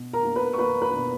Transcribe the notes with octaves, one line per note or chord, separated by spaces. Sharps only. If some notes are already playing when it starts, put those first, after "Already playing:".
Already playing: B2
A#4 A#5
A#3
B4 B5
C#6
A#3 B4 B5
B4 B5
B2